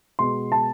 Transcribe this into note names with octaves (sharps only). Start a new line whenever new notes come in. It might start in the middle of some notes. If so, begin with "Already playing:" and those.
B2 G#3 B3 C6
A5